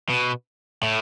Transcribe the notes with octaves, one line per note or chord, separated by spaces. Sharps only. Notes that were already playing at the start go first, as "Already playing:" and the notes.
B2
A2